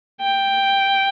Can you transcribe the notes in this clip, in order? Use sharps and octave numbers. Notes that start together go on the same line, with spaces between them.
G5